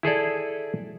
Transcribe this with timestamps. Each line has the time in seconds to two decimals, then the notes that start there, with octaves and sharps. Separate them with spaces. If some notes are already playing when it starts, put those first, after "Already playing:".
0.03 E4 G#4 A4 D5